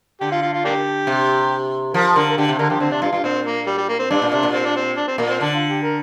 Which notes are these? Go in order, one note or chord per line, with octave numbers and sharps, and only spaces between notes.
D3 G4
F4
F4
F4
A#3 D4 G4
C3
F3 A#4
D3 A#4
A#4
D3 G4
C3 G4
D3 A#4
F3 G4
D3 C4
C3 D4
G2 F4
G2 F4
A#2 C4
A#3
G3
G3
A#3
C4
G2 D4
A#2
C3 D4
A#2
C4
D4
C4
D4
C4
A#2 A#3
C4
D3 D4
F4
G4
A#4